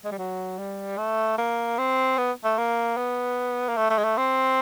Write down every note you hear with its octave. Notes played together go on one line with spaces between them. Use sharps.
G#3
G3
F#3
G3
A3
A#3
C4
B3
A3
A#3
B3
A#3
A3
A3
G#3
A3
C4